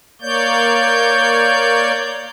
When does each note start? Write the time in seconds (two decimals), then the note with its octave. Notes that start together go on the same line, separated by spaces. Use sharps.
0.22 A#3 C#5 D5 G6